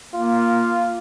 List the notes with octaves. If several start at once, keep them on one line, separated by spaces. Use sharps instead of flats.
A#3 F4